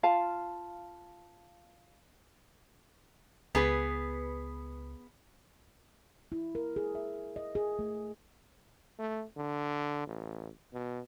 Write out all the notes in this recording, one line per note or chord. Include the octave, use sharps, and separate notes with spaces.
F4 F5 A5
C#2 B3 G#4 B4
E4
A#4
G#4
E5
D#5
G#4
A3
A3
D3
A1
B2